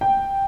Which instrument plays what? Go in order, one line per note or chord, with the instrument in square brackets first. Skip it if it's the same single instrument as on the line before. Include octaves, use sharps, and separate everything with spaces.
[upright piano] G5